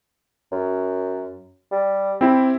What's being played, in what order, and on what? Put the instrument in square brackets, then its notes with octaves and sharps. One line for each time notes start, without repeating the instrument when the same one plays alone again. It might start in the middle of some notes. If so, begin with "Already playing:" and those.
[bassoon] F#2
G3
[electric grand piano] C4 E4 [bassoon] G4